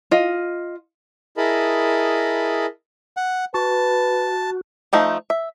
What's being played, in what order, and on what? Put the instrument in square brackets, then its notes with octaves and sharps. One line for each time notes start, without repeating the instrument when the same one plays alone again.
[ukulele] F4 D#5
[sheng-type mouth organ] E4 G#4 A#4 D#5 A5 B5
[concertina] F#5
[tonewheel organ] F#4 [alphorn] B4 [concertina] A5
[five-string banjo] F3 A3 D#4 F4
E5